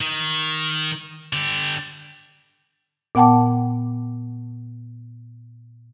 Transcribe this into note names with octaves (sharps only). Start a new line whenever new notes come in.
D#3
D3 G4
A#2 B3 F#5 G5 A5 D6